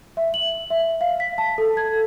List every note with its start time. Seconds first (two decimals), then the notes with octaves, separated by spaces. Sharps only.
0.17 E5
0.34 F#7
0.70 E5
1.01 F5
1.20 B6
1.38 A5
1.58 A4
1.77 G#6